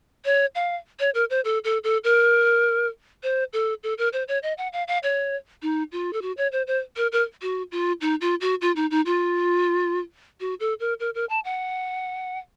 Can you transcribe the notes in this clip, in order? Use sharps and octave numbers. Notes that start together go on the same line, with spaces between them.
C#5
F5
C#5
A#4
C5
A4
A4
A4
A#4
C5
A4
A4
A#4
C5
C#5
D#5
F#5
F5
F5
C#5
D#4
F4
A4
F#4
C#5
C5
C5
A#4
A#4
F#4
F4
D#4
F4
F#4
F4
D#4
D#4
F4
F#4
A4
A#4
A#4
A#4
A5
F#5